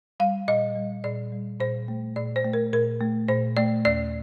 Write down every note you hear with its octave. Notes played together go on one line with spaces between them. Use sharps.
G3 F5
A#2 D#5
G3
A#2 D5
G3
A#2 C5
A3
A#2 D5
C5
A3
A#4
A#2 A#4
A3
A#2 C5
A3 D5
D#2 D5